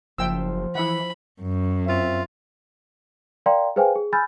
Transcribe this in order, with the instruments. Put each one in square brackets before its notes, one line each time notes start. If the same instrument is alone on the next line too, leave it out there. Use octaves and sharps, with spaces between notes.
[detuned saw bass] F#1 [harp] F3 C5 [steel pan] E5 G5 E6
[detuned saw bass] E3 [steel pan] E4 E5 F#5 [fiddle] B5
[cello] F#2
[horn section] C4 F4 E5
[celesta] A#4 D5 F5 G5 A#5 C6
G#4 B4 C5 F5 G5 G#5
G#4
G#5 B5 E6 F6 G6 A6